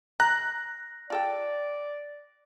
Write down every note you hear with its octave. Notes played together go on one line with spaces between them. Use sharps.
A#5 F#6 A#6
F4 A4 D5 G5